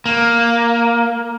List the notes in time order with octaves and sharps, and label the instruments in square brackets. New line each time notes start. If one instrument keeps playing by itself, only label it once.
[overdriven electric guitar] A#3